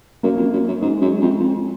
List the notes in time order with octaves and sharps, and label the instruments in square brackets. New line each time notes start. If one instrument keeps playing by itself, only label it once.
[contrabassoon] F#2 [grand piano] A#3
[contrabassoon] F2
F#2
F#2
[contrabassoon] G#2 [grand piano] G#3
[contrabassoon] F#2
F2
F2